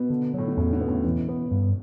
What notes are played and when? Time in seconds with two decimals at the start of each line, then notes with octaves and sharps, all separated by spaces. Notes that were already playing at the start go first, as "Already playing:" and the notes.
Already playing: B2 B3
0.10 D3
0.34 A2 F#3
0.48 B2
0.57 E2 A2 C#3
0.73 B2 D3
0.81 B3
0.88 A2 C#3
1.04 B2 E3
1.29 B3
1.51 G2